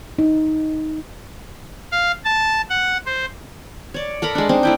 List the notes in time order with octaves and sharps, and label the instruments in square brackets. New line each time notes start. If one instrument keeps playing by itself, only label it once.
[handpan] D#4
[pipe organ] F5
A5
F#5
C5
[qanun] C#5 D5
A4 A#4 A#5 B5
G#3 D4
C4 D4 D#4 A#4
A3 E4 G5